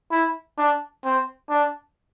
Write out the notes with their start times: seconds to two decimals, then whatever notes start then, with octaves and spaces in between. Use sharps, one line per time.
0.11 E4
0.58 D4
1.04 C4
1.49 D4